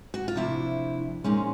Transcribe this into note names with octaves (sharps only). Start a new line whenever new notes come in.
F#4
F4
C3 F3 A3 D4 E4
A#2 F3 G#3 C#4 D#4